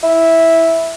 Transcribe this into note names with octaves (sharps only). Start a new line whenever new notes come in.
E4